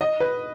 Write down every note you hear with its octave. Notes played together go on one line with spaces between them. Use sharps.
D#5
B4